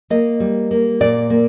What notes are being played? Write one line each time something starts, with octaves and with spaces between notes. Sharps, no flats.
A#3 D#5
G3
A#3
A#2 D5
A#3